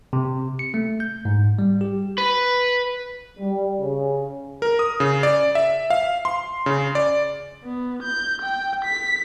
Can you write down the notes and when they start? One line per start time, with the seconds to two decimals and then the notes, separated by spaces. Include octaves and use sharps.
0.13 C3
0.59 C#7
0.74 A3
1.00 G6
1.25 G#2
1.59 G3
1.81 G4
2.18 B4
3.40 G3
3.80 C#3
4.62 A#4
4.79 D#6
5.00 C#3
5.23 D5
5.55 E5
5.90 F5
6.25 C6
6.66 C#3
6.95 D5
7.64 B3
8.03 G6
8.42 G5
8.85 B6